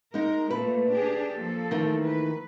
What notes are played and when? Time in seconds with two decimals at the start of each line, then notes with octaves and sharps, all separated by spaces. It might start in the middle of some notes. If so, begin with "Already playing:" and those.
0.14 G#3 D#4 A#4
0.50 A#2 A3 B4
0.94 D4 G4 G#4
1.33 F3 A#3 A4
1.71 D#3 E3 A3
2.05 B4